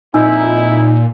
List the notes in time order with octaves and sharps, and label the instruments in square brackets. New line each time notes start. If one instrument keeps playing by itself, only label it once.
[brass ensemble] A#1 F2 E4 [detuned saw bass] A#2 [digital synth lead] D#4 [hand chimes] G#5 E6 G6